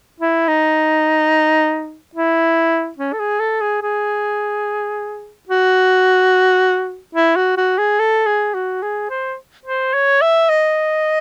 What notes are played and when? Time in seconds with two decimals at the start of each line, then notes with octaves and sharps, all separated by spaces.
0.20 E4
0.48 D#4
2.15 E4
2.98 C#4
3.13 A4
3.19 G#4
3.40 A4
3.61 G#4
3.82 G#4
5.49 F#4
7.15 E4
7.36 F#4
7.57 F#4
7.78 G#4
7.99 A4
8.26 G#4
8.54 F#4
8.82 G#4
9.10 C5
9.66 C5
9.94 C#5
10.21 E5
10.49 D#5